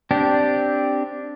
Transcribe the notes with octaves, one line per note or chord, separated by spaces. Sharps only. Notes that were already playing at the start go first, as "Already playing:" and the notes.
C4 D4 G4